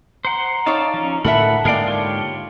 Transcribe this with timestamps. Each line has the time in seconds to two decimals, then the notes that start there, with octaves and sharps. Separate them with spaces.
0.25 C5 F#5 A#5 C6
0.66 D#4 C#5 D5 F5 A5
0.94 F3 C#4
1.24 A2 D3 A4 A#4 E5 F#5 A5 B5
1.65 G#2 D3 G#3 A#3 A#4 D5 F5 G5
1.88 F4 G4 C#5